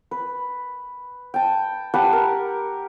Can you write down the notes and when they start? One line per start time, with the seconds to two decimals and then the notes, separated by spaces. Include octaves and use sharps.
0.11 B4
1.34 G5 A5
1.94 G4 B4 F#5 A5
2.12 A#4